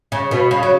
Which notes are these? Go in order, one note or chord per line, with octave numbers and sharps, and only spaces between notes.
C#3
B2
C#3
F#3